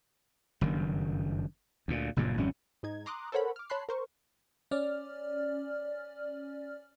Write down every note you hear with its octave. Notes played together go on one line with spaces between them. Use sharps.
F#1 G2 D#3
D2 A#2
F#1 G2 A#2 C#3
G#1 F2 G3 C#4
G#2 D#4 G#6
A#5 C6 D6 D#6 F#6
A4 A#4 C5 C#5 F#5 B5
D6 F6
C#5 A5 B5 C6 F#6 C7
A#4 C5 C#6
C#4 D5 F6